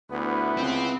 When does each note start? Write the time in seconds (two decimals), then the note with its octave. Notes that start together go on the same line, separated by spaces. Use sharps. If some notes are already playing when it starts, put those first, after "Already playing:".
0.10 D2 B3 E4 B4
0.57 C#2 C4